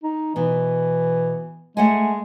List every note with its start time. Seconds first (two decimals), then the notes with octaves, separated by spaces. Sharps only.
0.03 D#4
0.36 B2 E3
1.77 G#3 A3 F#5 G#5